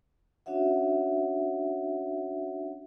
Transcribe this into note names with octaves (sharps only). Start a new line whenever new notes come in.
C#4 D4 F#4 C#5 E5 F#5